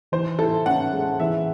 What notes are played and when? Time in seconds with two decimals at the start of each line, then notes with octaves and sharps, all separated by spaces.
0.12 E3 C5
0.39 E4 A4
0.66 C#4 F#5
0.93 G#3
1.20 E3 E5